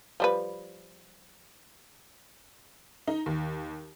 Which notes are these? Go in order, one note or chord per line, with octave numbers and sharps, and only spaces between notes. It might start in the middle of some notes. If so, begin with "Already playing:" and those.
F3 G3 B4
D#4
D#2